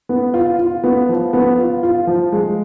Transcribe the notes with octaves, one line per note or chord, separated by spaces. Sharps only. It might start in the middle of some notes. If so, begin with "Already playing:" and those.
B3
F4
F4
B3
F3
B3
F4
F4
F3
G#3